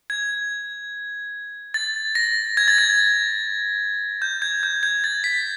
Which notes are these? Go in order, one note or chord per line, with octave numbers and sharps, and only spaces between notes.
G#6
A6
A#6
G#6
A6
G#6
G6
G#6
G6
G#6
A6
B6